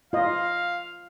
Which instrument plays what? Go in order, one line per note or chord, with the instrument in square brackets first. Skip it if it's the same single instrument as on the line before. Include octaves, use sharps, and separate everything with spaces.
[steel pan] F4 D#5 [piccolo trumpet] F5